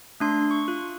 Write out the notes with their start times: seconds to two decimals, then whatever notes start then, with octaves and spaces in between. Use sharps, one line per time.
0.20 A3 D4 C6
0.51 C#6
0.68 F4